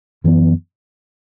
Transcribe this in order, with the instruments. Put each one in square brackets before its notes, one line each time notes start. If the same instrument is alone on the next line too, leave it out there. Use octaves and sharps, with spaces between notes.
[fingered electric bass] F#2 E3 B3